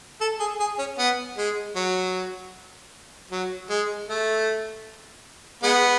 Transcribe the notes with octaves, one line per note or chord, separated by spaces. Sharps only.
A4
G#4
G#4
C#4
B3
G#3
F#3
F#3
G#3
A3
G#3 B3